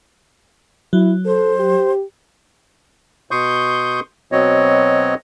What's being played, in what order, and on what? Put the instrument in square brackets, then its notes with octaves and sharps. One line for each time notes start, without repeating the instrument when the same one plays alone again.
[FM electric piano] F#3 [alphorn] E4
[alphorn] A4 [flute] C5
[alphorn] G4
[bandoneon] B2 C6 C#6 D#6 G6
B2 F#3 C4 C#5 D#5